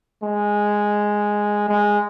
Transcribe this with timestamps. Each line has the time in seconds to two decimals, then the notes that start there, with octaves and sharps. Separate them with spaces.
0.23 G#3
1.68 G#3